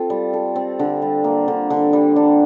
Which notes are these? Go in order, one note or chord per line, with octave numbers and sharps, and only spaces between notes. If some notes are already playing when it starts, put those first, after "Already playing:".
Already playing: C4 F4 A4
G3
A4
C4
D3
G3
A#3
D3
D3
G3
D4